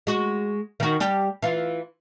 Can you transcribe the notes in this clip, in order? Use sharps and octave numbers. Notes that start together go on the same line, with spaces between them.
G#3 F#4
D#3 F#4
G3 G4
E3 F4